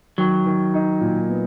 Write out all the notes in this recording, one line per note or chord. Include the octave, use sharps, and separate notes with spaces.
D#3 F#3
D#3
D#4
A#2
B3